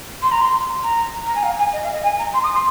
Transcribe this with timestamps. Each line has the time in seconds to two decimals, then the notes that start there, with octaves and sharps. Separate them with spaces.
0.22 C6
0.32 A#5
0.41 C6
0.83 A#5
1.26 A#5
1.35 G#5
1.43 F5
1.58 G#5
1.73 D#5
1.83 F5
1.93 D#5
2.03 G#5
2.19 A#5
2.34 C6
2.44 D#6
2.55 C6